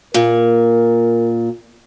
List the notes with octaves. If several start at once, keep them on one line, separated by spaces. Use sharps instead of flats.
A#2 A#4